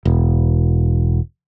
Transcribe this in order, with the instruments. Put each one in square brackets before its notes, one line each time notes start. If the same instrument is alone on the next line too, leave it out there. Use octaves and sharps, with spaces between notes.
[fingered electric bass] E1